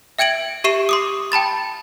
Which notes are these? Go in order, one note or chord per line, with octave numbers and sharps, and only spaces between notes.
E5 G5 G#6 D7 F#7
G4 E5 C#6 C7 E7
C6 D6 D#6
G5 A5 B5 A6